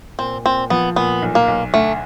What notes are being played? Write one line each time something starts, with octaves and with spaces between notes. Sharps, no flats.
A#2 C4
A#2 C4
F3 B3
A#2 B3
B1
A#3
B1
D2 A3